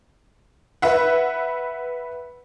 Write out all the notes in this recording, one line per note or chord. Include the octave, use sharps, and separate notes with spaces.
B4 E5 F#5